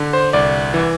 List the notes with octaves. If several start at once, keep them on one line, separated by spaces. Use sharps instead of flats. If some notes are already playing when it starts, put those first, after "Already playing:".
Already playing: D3
C5
C2 D5
E3